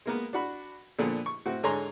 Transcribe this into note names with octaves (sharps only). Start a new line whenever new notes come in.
G#3 A#3 B3
D4 F#4 B5
A#2 D3 F3 B3
C#6
A2 C4 F#4
G#2 D3 C#5 G#5 A#5 C6